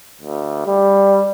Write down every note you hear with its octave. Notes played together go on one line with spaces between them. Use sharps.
D2
G3